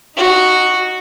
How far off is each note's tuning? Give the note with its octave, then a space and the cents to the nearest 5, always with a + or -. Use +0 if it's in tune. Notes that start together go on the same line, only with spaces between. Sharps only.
D#4 +0 F#4 +0